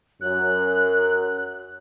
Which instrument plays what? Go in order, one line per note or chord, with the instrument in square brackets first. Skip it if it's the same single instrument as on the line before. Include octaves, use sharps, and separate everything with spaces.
[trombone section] F#2 [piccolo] F#6